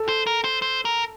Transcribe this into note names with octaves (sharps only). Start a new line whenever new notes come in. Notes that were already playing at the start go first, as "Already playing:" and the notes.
Already playing: A4
C5
A#4
C5
C5
A#4